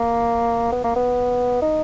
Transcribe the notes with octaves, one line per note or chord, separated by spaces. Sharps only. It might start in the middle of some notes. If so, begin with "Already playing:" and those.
Already playing: A#3
B3
A#3
B3
D#4